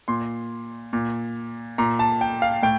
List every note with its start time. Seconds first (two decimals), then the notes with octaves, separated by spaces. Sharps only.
0.08 A#2 C6
0.93 A#2
1.78 A#2 A#5
1.99 A5
2.21 G5
2.42 F5
2.63 A2 G5